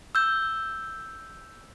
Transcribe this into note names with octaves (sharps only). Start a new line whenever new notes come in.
E6 G6